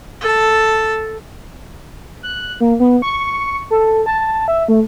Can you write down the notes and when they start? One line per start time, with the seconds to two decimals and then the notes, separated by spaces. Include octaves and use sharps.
0.21 A4 A5
2.23 F#6
2.61 A#3
2.80 B3
3.02 C#6
3.71 A4
4.06 A5
4.48 E5
4.68 A3